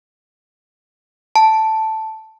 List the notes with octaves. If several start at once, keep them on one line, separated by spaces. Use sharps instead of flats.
A5